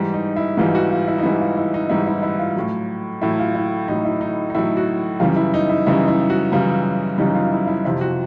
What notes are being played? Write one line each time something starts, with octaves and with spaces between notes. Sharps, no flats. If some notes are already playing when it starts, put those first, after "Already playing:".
Already playing: G#2 E3 G3
D#4
E4
G#2 E3 G3 F4
F#4
F4
E4
D#4
G#2 E3 G3 E4
F4
E4
D#4
G#2 E3 G3 E4
E4
E4
F4
A2 F#3
A2 F#3 E4
F4
E4
A2 F#3 D#4
E4
D#4
D#4
A2 F#3 E4
F#4
F#2 C#3 E3 G3 F4
E4
D#4
E4
F#2 C#3 E3 G3 E4
E4
F#4
F#2 C#3 E3 G3 F4
F#2 C#3 E3 G3 D#4
F4
E4
E4
F2 C3 F3 E4
F#4